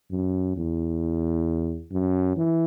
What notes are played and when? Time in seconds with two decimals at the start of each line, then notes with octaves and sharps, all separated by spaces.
0.12 F#2
0.57 E2
1.92 F#2
2.37 E3